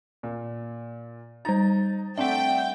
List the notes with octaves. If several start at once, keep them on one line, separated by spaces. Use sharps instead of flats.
A#2
G3 D#4 A#5 A6
A3 C4 D4 E5 F#5 G5